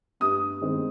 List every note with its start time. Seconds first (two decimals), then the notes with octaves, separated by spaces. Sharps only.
0.20 G2 D#6
0.62 D#3 G#3 C4